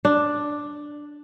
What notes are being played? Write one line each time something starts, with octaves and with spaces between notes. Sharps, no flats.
D4